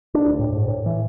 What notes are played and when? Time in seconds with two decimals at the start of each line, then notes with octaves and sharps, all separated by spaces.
0.14 D4
0.27 D2
0.39 A2
0.52 G#2
0.68 A2
0.86 E3